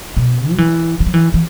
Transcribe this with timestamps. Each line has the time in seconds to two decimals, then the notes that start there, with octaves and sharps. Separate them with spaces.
0.17 B2
0.51 F#3
0.58 E3
1.00 E3
1.07 F#3
1.14 E3
1.34 E3